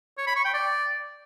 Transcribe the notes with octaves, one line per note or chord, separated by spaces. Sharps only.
C#5
B5
C#6
G5
D5